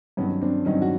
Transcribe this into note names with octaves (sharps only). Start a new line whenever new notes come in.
G2 D#3 F#3 B3 C#4
C4 D4
G2 D#3 F#3 C#4 D#4
F#4